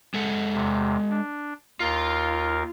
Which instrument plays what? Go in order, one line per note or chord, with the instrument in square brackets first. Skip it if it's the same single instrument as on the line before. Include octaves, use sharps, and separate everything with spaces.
[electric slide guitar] G#3 A4 F#5
[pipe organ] E2 C3
D4
[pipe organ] D#2 A#4 F5 [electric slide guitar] F4